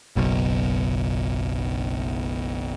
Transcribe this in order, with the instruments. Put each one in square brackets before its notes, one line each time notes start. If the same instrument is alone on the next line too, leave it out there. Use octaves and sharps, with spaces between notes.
[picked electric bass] F#1 B1 B2